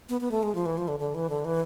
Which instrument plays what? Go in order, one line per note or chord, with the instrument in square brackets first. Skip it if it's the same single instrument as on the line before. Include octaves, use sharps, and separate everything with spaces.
[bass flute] B3
B3
A3
G#3
F3
E3
F3
D3
D3
E3
D3
E3